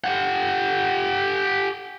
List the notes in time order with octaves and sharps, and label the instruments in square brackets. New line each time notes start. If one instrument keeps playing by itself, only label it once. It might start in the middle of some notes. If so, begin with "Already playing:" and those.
[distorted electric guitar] G4 F#5